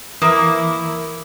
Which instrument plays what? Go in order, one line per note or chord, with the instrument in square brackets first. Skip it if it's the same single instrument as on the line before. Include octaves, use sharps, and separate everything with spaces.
[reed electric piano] E3 [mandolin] A#3 [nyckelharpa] E4 [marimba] D#6